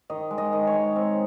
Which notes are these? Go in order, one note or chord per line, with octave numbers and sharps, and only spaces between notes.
D#3 D#5
G#3
D#5
D#3
C#5
G#3
C4